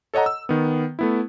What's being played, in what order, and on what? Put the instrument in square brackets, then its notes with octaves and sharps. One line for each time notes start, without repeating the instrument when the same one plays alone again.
[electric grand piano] A4 C#5 D#5 F#5 A#5
E6
D#3 B3
A3 B3 E4